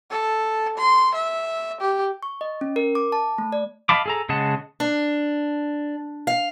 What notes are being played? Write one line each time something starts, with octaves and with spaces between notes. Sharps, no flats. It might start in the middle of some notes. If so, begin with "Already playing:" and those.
A4
C6
E5
G4
C#6
D#5
C#4
A#4
D6
A5
A3
D5
D#5 F5 A5 B5 D6
G#4 A4 A#5
C#3 G#3 D#5 F#5 A5
D4
F5